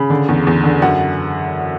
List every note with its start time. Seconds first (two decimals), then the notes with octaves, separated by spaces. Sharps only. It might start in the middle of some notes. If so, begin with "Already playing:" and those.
Already playing: C#3 B5
0.10 D3
0.29 E2
0.47 E2
0.64 D3
0.82 F#2 F#5